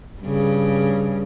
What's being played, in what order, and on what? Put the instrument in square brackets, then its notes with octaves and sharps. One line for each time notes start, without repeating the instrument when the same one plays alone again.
[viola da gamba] G2 C#3